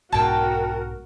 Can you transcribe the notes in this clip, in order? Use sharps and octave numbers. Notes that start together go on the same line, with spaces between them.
B1 G#2 B2 F#4 A#4 G5 A5